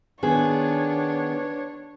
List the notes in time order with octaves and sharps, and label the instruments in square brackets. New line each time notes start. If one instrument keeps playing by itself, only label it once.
[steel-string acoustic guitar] D#3 B3 G#4 [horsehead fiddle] D4 C#5